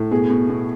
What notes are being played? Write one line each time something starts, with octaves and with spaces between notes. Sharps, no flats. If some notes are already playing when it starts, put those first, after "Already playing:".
Already playing: A2
B2 G#4
B2
B2